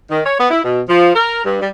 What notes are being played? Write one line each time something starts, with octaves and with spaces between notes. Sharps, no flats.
D#3
C#5
B3
E4
B2
F3
A#4
G2
G3